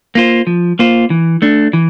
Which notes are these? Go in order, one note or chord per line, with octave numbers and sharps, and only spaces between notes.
A#3 F4 C5
F3
A#3 F4 C5
E3
A3 D4
E3